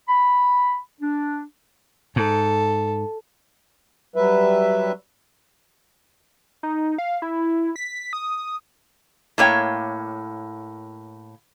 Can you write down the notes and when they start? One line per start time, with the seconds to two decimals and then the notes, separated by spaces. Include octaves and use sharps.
0.09 B5
1.01 D4
2.16 G#2 A4
4.16 F#3 G3 B4 E5
6.63 D#4
6.98 F5
7.22 E4
7.76 B6
8.13 D#6
9.38 A2 A#3 C#5 G5